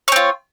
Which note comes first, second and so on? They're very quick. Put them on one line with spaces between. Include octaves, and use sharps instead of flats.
C#5 C4 F4